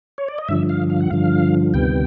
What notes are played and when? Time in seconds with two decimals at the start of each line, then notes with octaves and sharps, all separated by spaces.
0.18 C#5
0.28 D5
0.38 D#5
0.48 G2 D3 F3 E5
0.69 F5
0.90 F5
1.00 F#5
1.10 G2 D3 F3 F5
1.74 D2 C3 D#3 G3 B3 G5